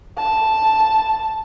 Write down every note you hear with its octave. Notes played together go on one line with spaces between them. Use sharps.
A5